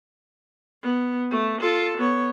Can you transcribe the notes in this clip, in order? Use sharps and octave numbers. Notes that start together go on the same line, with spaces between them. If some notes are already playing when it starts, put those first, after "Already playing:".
B3
A3
F4 A4
B3 C#5